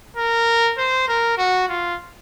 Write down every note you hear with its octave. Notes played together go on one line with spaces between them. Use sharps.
A#4
C5
A#4
F#4
F4